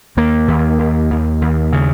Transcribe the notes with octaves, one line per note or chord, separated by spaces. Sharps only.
D#2 A#3
D#2
D#2
D#2
D#2
C#3